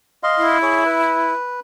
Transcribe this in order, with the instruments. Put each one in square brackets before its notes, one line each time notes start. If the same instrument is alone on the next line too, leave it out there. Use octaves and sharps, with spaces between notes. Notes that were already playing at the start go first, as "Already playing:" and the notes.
[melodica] D#5 F5 C6
[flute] E4
[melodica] G#4 C#5
B4